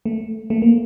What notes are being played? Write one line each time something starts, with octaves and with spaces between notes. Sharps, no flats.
A3
A3
A#3